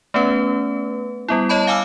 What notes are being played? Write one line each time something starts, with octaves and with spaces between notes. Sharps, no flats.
A3 B3 C#4 B4
G3 B3 E4
C#5 D#5 A5 B5
F5 G#5 D6 E6 F6